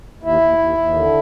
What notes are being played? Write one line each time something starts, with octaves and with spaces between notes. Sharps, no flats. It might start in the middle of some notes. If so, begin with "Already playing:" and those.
D#2 E4
D#2
D#2
D#2
D3